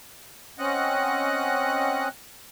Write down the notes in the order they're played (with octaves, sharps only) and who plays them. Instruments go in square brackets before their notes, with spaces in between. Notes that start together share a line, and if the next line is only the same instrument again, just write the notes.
[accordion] C4 C#4 D#5 F#5 F#6